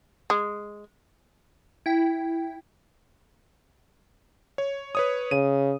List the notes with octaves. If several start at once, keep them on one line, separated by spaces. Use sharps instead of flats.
G#3
E4 G5
C#5
B4 C#5 D#6
C#3 D#7